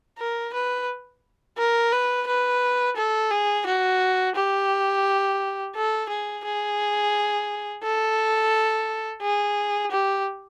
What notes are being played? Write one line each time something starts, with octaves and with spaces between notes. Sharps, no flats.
A#4
B4
A#4
B4
B4
A4
G#4
F#4
G4
A4
G#4
G#4
A4
G#4
G4